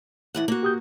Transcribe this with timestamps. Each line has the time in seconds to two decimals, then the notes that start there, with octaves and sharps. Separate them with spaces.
0.35 A2 E3 F#5
0.48 A#3 F#4
0.63 G4 D#6 G6